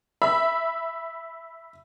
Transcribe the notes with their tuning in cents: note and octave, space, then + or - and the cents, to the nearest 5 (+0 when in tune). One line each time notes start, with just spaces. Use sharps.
E5 +0 B5 +0